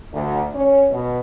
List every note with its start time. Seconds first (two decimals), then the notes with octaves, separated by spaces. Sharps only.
0.12 D2
0.54 C#4
0.91 B2